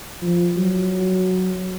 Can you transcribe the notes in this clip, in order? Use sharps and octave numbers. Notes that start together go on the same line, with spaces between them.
F3
F#3